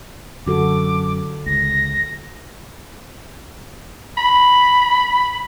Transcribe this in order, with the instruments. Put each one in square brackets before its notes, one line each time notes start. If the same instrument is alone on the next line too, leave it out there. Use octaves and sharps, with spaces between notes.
[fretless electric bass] F#2 [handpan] D3 F#4 A4 [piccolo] D6
[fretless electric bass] C#2 [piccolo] A#6
[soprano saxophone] B5